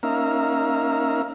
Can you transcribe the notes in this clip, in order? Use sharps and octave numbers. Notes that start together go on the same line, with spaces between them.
A#3 C#4 D#4 E5 F5 A#5